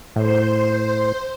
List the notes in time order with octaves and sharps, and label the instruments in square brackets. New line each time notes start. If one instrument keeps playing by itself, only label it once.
[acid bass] A2 [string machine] C5